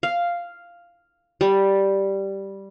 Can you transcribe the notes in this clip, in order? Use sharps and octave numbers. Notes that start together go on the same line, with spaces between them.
F5
G3